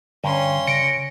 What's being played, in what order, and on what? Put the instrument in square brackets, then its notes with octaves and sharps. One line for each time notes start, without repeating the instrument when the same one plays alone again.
[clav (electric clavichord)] G2 [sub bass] D3 [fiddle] C#4 C6
[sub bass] C#3 [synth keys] A#6 C#7 D7